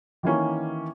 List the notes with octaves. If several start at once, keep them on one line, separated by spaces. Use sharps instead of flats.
D#3 E3 A#3 C#4